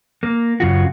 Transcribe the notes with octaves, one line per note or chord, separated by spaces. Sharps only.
A#3
F#2 C#3 F4 F#4